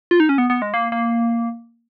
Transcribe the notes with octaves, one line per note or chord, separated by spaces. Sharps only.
F4
D#4
C#4
B3
B3
G#3
A#3
A#3